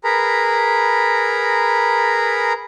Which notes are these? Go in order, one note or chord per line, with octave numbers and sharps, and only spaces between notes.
G#4 A#4 B4 A#5 B5